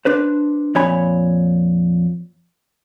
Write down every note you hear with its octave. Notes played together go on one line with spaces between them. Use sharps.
D4 B4 C5
F2 A#2 C#5 G#5 B5